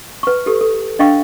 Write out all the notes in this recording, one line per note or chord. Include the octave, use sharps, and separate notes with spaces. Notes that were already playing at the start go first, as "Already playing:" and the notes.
B4 C#6
G4 A4
A4
D4 D#5 F5 G5 C#6